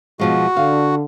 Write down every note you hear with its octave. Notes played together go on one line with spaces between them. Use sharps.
B2 F3 G#3 F#4
D3 F5